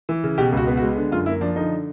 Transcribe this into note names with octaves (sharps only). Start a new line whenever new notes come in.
E3
C#3
B2 G4
C#2 F#4
B3
F#4
G#3
D3
F#2 F4
A#3 E4
F3 D4
D3 D#4